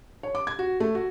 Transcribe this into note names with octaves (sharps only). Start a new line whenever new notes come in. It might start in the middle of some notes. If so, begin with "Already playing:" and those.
C#5
D6
G#6
F#4
A3
F#4